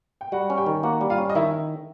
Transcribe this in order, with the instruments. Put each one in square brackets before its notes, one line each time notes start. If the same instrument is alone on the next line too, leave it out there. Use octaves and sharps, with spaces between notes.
[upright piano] G5
[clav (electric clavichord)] G3 [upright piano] F#4 F#5
[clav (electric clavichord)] C#4
[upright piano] G4 G5
[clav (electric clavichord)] D#3
[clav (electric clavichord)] A#3 [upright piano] F#4 F#5
[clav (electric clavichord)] G3
[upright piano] F4 F5
[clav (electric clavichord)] C#4
[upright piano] D#5
[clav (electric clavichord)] D#3 [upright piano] E4 E5